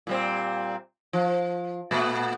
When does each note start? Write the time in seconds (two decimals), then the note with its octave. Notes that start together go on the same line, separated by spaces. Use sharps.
0.07 A#2 G3 C4
1.13 F3
1.91 A#2 A3 B3